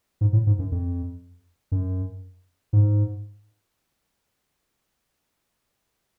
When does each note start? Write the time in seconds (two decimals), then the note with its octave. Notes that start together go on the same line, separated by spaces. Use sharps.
0.21 G#2
0.33 A2
0.47 G#2
0.59 F#2
0.72 F2
1.72 F#2
2.73 G#2